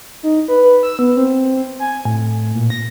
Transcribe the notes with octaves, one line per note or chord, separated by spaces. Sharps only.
D#4
B4
B4
E6
B3
C4
G#5
A2
A#2
A#6